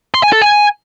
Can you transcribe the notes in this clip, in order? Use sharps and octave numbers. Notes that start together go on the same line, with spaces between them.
C6
G#5
A4
G#5